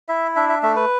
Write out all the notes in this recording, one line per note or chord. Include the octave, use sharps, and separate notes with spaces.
E4 E5
D4 E5
E5
A3 E5
B4